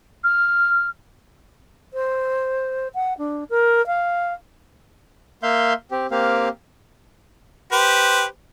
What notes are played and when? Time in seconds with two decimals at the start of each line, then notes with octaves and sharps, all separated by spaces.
0.24 F6
1.94 C5
2.94 F#5
3.18 D4
3.50 A#4
3.87 F5
5.43 A#3 E5 F5 C6 G6
5.91 C4 G4
6.11 A#3 C4 G4 F5
7.72 G4 B4 C5